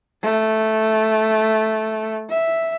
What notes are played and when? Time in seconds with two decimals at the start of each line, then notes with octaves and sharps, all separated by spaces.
0.22 A3
2.29 E5